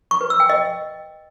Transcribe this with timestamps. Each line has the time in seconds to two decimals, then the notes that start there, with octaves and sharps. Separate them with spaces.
0.11 C#6
0.21 B4
0.30 E6
0.40 G5
0.50 D#5